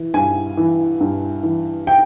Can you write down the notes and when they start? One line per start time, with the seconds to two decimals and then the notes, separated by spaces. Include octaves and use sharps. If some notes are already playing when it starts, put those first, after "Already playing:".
Already playing: E3
0.14 G2 G#5
0.57 E3
1.01 G2
1.43 E3
1.87 G5